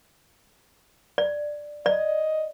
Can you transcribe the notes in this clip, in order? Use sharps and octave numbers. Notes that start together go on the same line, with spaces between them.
D5
D5 D#5